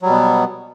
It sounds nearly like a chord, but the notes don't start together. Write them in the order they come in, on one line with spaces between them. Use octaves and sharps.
F#3 G3 B2 B3